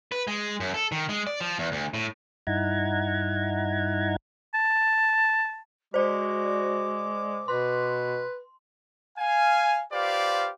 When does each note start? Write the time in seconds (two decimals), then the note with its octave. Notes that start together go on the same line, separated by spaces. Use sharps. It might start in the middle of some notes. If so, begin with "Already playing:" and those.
0.12 B4
0.27 G#3
0.60 F#2
0.74 A4
0.92 D#3
1.09 G#3
1.27 D5
1.40 F3
1.59 E2
1.72 D2
1.94 A2
2.47 G2 D#4 E4 F#5 A#5 G#6
4.54 A5
5.94 G#3 F#4 C5 D5 D6
7.48 B2 B4 C6
9.19 F5 G#5
9.93 F4 G4 B4 C5 D5 F5